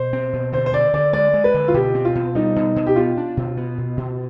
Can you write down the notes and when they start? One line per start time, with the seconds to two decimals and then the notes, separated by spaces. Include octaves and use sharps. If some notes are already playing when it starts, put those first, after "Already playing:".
Already playing: B2 C5
0.13 C4
0.33 B2
0.53 D3 C5
0.66 C5
0.73 D3 D5
0.94 D3 D5
1.13 G#3 D5
1.34 G#3
1.44 B4
1.54 D3
1.68 F4
1.74 B2 G4
1.95 C4
2.05 F4
2.15 B2
2.35 G3 D#4
2.56 B2
2.76 B2
2.86 G4
2.96 B3 F4
3.17 D4
3.37 B2
3.57 B3
3.78 B2
3.97 B2